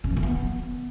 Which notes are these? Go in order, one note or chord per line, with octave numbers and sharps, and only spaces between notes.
C#3
F3
D3
B3